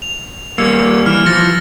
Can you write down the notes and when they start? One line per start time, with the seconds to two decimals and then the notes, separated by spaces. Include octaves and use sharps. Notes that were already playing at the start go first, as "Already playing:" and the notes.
0.02 F7
0.58 G3 A#3 E6 G#6 C#7
1.06 E3 F6
1.26 F3 A6 A#6 C#7